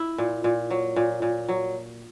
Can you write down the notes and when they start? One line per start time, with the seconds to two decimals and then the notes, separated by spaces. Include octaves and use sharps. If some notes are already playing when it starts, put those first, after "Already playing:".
Already playing: E4
0.18 A#2
0.44 A#2
0.70 F#3
0.96 A#2
1.22 A#2
1.49 F#3